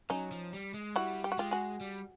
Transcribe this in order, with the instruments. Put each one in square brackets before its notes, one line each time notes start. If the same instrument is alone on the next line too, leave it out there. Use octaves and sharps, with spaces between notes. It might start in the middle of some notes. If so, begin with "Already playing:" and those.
[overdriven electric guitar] F#3 [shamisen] C#4 D#4
[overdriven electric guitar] F3
G3
G#3
[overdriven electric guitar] G3 [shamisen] E4 F#4
[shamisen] G4
F#4
[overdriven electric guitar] G#3 [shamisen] F4 G4
[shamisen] F#4 G#4
[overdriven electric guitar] G3